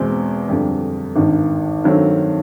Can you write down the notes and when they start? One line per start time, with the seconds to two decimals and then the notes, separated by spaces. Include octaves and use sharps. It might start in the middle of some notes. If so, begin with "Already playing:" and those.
Already playing: E2 B2 G#3 C4
0.48 F2 D3 G3
1.16 G#1 G2 D#3
1.84 G2 D#3 F#3 A3 C4